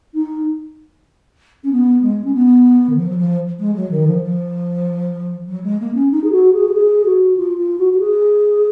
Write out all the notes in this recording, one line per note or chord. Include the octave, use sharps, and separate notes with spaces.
D#4
C#4
B3
G#3
C#4
B3
D#3
F3
F#3
F3
G#3
F#3
D#3
F3
F3
F#3
G#3
A#3
C#4
D#4
G#4
F#4
G#4
F#4
G#4
F#4
F4
F4
F#4
F#4
G#4